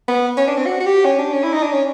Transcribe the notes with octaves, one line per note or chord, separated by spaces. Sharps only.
B3
C#4
D4
C4
F#4
F#4
G4
C#4
D4
C#4
E4
D#4
D4
C#4